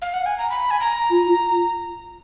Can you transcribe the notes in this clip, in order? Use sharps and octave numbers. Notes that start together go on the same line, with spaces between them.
F5
F#5
G#5
A#5
B5
G#5
A#5
F4